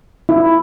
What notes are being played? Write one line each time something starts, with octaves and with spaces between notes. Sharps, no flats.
E4